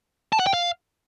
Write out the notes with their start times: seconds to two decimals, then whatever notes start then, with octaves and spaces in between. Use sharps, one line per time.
0.33 A5
0.40 F#5
0.47 G5
0.54 F5